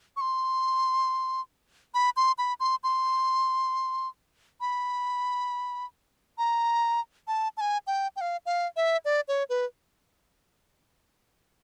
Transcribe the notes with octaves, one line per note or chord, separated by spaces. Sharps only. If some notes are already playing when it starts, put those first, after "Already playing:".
C#6
C6
B5
C6
B5
C6
C6
B5
A#5
A5
A5
G#5
G5
G5
F5
F5
E5
D5
C#5
B4